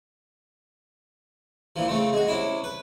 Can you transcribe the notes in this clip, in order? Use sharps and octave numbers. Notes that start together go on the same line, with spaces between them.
A#2 E3 F3
C#3 A3 C4
G#3 F#4
C3 C#4 E4
B4